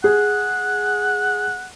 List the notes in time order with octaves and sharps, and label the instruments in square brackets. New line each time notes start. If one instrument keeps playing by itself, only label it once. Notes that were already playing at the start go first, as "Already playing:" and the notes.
[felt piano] G#4 [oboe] F#5